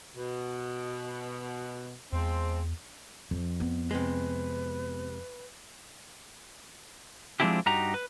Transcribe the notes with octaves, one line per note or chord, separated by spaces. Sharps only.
B2
E2 F3 G#3 C4
F2 F3
B3
C3 G#3 B4
F3 G#3 C4 D4 E4 G4
G2 D#4 F#4 G4 A#5
B4